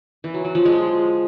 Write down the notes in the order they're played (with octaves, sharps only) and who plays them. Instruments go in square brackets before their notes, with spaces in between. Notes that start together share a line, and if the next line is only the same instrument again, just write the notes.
[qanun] E3
F#3
F#3
F3
G#3